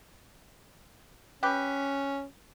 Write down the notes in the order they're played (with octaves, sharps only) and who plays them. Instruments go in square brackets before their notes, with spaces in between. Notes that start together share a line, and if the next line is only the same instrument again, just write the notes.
[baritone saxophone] C#4 [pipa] G4 B4